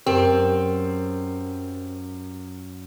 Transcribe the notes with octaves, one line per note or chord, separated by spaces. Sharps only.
F#2 C4 G4 A#4